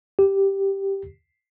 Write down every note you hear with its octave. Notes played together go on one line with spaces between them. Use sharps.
G4